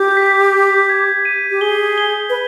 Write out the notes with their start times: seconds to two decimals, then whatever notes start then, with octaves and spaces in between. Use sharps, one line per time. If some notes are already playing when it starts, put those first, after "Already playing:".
Already playing: G4 G6
0.17 B6
0.53 G6
0.89 G#6
1.25 D#7
1.51 G4
1.61 G#4 G7
1.98 G7
2.29 B4